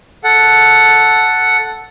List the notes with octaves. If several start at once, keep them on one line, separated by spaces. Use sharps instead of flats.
A4 F#5